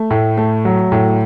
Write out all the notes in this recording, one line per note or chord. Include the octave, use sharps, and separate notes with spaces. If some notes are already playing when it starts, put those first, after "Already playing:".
Already playing: A3
A2
A3
F#3
A2